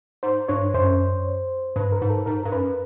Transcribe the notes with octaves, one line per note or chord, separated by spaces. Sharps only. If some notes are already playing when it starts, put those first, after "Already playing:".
G#2 C5
G2 C#5
F#2 C5
G2 B4
A#4
G#2
A4
G#2 A#4
G2 A#4
F#2 B4